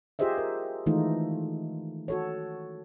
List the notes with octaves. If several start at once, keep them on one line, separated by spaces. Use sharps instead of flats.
F4 G4 G#4 C5 D#5 E5
A#4
D#3 E3 G#3 A3 D#4 F4
F#4 A4 C#5